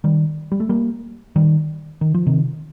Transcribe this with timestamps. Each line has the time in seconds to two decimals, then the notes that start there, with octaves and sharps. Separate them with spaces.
0.04 D#3 G3
0.52 G3
0.60 A3
0.69 G3 A#3
1.36 D#3 G3
2.01 D#3
2.14 F3
2.27 C3 D#3